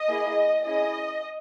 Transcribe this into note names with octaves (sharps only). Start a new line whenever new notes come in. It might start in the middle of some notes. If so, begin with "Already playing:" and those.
Already playing: D#5
A#3 E4 G#4
C#4 E4 G#4 D#5